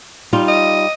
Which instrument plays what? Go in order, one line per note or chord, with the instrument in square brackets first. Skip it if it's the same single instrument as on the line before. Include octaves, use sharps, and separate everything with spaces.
[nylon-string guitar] G3 D#4 F4
[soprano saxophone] D#5